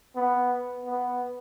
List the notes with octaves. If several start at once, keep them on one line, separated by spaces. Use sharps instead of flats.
B3
B3